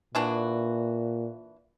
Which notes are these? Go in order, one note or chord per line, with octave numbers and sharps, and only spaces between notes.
A#2 E3 D4 F#4